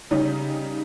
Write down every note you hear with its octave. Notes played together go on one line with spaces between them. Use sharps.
C#3 G3 C#4 D#4